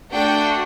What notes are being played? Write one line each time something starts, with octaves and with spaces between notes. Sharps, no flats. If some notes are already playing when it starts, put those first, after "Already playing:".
A3 D4 F#4 G5